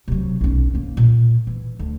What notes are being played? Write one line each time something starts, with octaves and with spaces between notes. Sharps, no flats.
C3 F#3
B1 C#4
F#2 A#3
A#2
E3
D2